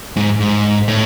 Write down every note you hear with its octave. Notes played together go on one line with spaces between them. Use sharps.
G#2
G#2
A2